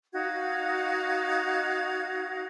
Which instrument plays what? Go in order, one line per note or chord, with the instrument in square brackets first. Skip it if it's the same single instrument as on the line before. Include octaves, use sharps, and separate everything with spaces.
[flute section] D#4 F#4 F5 G#6